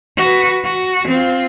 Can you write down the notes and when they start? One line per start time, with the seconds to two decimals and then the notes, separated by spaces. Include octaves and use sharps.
0.17 F#4 B4
0.65 F#4
1.08 C4 F4